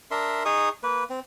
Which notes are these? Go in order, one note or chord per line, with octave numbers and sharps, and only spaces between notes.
D4 A#4 E5 C6
D#4 G#4 C#6 D#6
A#3 B4
C4